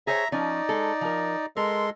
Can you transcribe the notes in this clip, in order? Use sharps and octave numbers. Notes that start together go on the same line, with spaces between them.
G#4 C5 C#5 E5 A#5
F3 C#4 D#4 D5
G#3 A4
F3 A#4
G#3 A4 A#4 C6